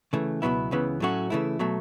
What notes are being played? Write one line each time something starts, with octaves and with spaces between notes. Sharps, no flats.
C#3 E3 A3
C#2 B2 F#3 B3 E4
C#2 C#3 E3 B3
A2 F#3 A3 C#4 F#4
C#3 E3 A3 E4
B2 F#3 A3